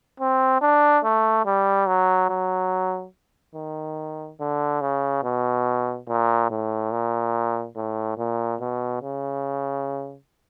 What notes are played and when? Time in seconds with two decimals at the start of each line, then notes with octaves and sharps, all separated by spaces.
0.20 C4
0.61 D4
1.04 A3
1.46 G3
1.87 F#3
2.30 F#3
3.55 D#3
4.40 D3
4.81 C#3
5.23 B2
6.09 A#2
6.51 A2
6.92 A#2
7.76 A2
8.18 A#2
8.61 B2
9.02 C#3